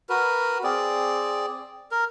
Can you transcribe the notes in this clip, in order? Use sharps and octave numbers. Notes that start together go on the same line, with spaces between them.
F#4 A#4 B4
C4 G#4 D5
A#4